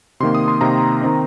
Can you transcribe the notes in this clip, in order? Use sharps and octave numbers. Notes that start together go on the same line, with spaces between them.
C3 D#3 A#3 C6
D#6
C6
C3 D#3 A#3 A#5
D#3 C4 D#4